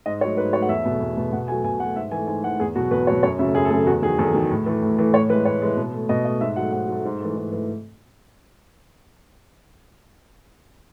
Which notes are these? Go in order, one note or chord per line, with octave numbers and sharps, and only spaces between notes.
G#2 D#5
F#3 A3 C#5
G#2 B4
F#3 A3 C#5
F#5
E2 E5
B2 A3
E2
B2 A3
B2 F#5
F#3 A3 G#5
B2 G#5
F#3 A3 F#5
G#2 E5
E3 A3 G#5
G#2 G#5
E3 A3 F#5
E2 G#4
B2 F#3 F#4
E2 B4
B2 F#3 C#5
F#2 C#5
C#3 F#3 A3 E5
F#2 G#4
A4
C#3 F#3 A3 G#4
E2 F#4
D#3 F#3 G#4
E2 A4
D#3 F#3
A2
E3 A3
A2
E3 A3
A2 C#5
E3 G#3 B4
A2 C#5
E3 G#3
B2
A3
B2 D#5
A3 D#5
G#2 E5
F#3 A3 F#5
G#2 F#5
F#3 A3
G#2
E3 A3
G#2
E3 A3